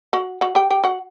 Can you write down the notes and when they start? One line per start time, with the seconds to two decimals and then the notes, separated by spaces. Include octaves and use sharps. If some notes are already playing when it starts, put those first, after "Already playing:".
0.13 F#4 F#5
0.41 F#4 F#5
0.55 G4 G5
0.70 G4 G5
0.84 F#4 F#5